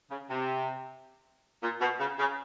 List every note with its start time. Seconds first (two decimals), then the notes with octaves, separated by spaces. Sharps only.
0.10 C#3
0.29 C3
1.62 A#2
1.81 B2
1.99 C#3
2.19 C#3